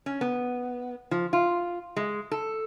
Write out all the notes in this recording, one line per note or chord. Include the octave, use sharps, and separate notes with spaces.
C#4
B3
F3
F4
G#3
A4